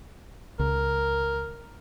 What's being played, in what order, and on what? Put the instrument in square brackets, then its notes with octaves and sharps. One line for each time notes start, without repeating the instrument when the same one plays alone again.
[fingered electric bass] C#2 [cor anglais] A#4